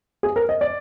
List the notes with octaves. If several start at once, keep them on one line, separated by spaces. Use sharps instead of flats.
G#4
A#4
D#5
D5